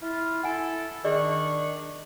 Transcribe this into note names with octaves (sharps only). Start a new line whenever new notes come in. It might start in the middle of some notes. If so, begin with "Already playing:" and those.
E4 F4
E4 A4 F#5 G#5
D#3 D4 G#4 D5 D#5 C#6